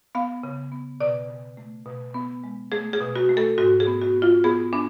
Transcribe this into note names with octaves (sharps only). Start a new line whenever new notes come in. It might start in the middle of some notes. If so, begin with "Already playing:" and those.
B3 F5
C#3
B3
B2 D5
B2
A3
B2
B3
G#3
A3 G#4
G#4
B2
F#4
A3
A4
G#2 F#4
G#4
B3
F#4
B3
F4
B3 G#4
B3 D4